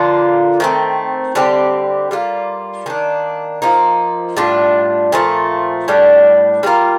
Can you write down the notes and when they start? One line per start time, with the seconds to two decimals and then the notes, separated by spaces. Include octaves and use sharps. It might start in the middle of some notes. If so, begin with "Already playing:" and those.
Already playing: D3 F3 A#3 F4
0.60 D#3 A3 C4
1.35 D3 G3 C4 G4
2.11 G3 A#3 F4
2.86 D#3 A#3 D4
3.62 F3 A#3 D#4
4.37 A2 G3 D4 F4
5.12 A#2 F3 A3
5.88 A2 G3 D4
6.63 G3 A#3 F4 A#4